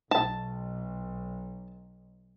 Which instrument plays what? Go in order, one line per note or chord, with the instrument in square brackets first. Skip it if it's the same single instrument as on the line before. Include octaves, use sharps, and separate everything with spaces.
[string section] B1 [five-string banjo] A5